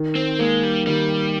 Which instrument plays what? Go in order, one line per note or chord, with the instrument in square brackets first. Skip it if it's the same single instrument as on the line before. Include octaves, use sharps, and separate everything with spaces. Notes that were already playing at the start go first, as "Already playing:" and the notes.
Already playing: [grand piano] D#3
[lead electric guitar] C4
[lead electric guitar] G#3 [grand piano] A#3
[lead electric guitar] G3
[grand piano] D#3 [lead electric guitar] G3